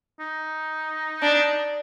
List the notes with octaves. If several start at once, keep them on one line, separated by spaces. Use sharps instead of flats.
D#4
D4